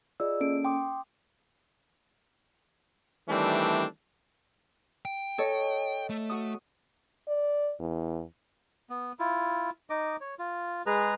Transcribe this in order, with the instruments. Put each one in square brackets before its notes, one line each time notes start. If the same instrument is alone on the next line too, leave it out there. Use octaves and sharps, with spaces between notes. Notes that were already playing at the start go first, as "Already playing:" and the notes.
[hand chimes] F4 G#4 D5 D#5 E6
A#3 C#4 A4 D7
G5 C6 D6 D#6
[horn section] D#3 E3 G3 A3 C4 D4
[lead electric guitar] G5
[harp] A4 C#5 D#5
[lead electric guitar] A3
[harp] F#4 D#6
[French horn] D5
E2
[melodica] B3
E4 F4
D#4 D#5 D6
C#5
F4
G#3 G#4 B4 A#5